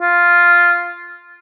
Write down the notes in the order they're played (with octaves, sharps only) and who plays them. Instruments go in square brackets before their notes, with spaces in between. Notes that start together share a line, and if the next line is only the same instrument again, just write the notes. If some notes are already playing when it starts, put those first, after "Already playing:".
[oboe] F4